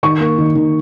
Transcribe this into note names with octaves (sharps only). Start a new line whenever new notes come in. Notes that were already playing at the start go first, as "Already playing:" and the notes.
D#3 C#6
A#3
D#3
D#3